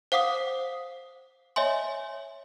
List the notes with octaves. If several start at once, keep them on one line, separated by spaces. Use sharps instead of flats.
C5 F5 F#5 D6 D#6 B6
C#5 D#5 E5 G#5 C6